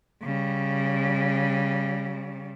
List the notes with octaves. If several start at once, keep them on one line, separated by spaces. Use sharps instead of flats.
C#3 G3